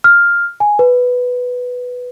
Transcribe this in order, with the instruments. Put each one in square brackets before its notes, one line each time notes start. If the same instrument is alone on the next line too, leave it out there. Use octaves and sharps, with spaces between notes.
[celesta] F6
G#5
B4